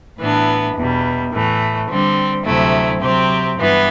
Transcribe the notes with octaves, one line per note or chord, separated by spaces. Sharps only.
A2 E3 B3 D4
E2 B2 G3
A2 E3 A3
D3 G3 C4
D2 C3 F#3 A3 E4
C3 F#3 C4 G4
G2 E3 B3